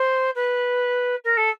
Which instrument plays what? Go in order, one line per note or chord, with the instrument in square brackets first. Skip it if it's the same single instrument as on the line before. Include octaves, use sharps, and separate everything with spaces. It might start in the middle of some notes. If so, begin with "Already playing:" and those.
Already playing: [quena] C5
B4
A#4
A4